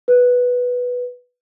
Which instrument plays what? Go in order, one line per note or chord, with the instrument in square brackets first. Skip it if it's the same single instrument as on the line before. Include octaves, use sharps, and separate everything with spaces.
[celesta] B4